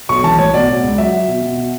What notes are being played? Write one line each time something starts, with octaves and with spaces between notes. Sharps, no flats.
B1 C#6
E3 A5
A2 C#5
B2 D5
B2
C#2
F#3 E5
F#3
B2
B2
B2